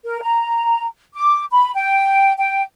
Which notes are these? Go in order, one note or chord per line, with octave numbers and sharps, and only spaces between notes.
A#4
A#5
D6
B5
G5
G5